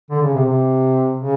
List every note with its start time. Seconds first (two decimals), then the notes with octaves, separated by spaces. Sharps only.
0.11 D3
0.22 C#3
0.34 C3
0.46 C3
1.17 C#3